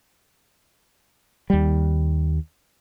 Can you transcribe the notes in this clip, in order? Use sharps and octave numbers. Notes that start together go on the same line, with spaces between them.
D#2 G3